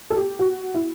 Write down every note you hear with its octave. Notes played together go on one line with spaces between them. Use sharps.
A4
G4
F#4
E4